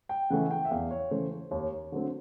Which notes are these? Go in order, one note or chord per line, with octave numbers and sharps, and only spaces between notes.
G5
C#3 E3 A3 F#5
G5
E5
E2 F5
C#5
C#3 E3 A3 C5
C5
D#2 C#5
D3 F#3 A3 C4